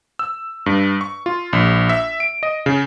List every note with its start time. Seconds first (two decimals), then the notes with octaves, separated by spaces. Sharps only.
0.19 E6
0.66 G2
1.01 C#6
1.26 F4
1.53 A#1
1.89 E5
2.20 D7
2.43 D#5
2.66 C#3